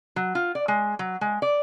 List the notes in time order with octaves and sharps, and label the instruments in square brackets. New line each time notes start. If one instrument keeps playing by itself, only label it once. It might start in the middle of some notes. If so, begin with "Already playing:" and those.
[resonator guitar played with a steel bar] F#3
F4
D5
G#3
F#3
G#3
D5